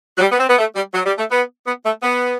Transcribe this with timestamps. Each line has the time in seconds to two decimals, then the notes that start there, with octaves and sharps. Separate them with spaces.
0.17 F#3
0.21 G3
0.31 B3
0.39 C4
0.49 B3
0.58 A3
0.75 G3
0.93 F#3
1.06 G3
1.18 A3
1.30 B3
1.66 B3
1.85 A3
2.02 B3